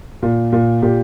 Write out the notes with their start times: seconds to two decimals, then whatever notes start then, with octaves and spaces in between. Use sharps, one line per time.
0.22 A#2
0.52 A#2
0.82 A#2 G4